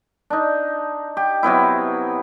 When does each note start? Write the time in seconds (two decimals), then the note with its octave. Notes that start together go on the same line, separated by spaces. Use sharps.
0.30 D4 D#4
1.17 G4
1.43 C3 F#3 B3 E4